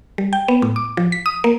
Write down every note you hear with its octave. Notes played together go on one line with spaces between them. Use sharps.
G3
G5
B3
A2
D6
F3
B6
D#6
A#3